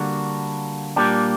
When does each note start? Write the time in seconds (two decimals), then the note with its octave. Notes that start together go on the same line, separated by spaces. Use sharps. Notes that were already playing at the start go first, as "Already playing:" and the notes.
Already playing: D3 G3 A#3 D4 F#4
0.96 A#2 G3 A#3 D4 G4